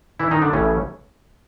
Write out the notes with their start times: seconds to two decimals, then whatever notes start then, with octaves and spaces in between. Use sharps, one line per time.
0.19 E3 E4
0.31 D#3 D#4
0.42 D3 D4
0.53 A1 A2 C#3 E3 C#4